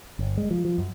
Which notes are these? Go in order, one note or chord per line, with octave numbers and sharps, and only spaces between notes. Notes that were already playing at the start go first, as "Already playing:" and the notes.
G1
G#3
F3
F3
F#2